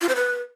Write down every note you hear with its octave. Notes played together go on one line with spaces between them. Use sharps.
F4
C5
B4